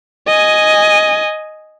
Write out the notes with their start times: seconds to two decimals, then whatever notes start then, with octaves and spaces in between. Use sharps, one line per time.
0.27 D#5 G#5